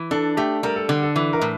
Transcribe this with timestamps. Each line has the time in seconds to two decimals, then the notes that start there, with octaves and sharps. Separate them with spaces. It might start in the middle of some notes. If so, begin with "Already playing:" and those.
Already playing: E3
0.11 D4 A4
0.37 A3 G4
0.63 G3 A#4
0.76 A4
0.89 D3
1.03 A4
1.16 E3
1.33 A#4
1.41 A2